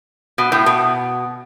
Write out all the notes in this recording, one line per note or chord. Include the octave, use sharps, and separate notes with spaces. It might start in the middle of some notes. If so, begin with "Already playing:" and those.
B2
A2
B2